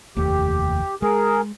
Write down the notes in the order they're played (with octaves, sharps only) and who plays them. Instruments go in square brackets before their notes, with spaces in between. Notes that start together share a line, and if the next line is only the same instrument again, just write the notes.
[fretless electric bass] F1 D#2 A3 [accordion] G4
[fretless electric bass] G#3 [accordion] G#4 A#4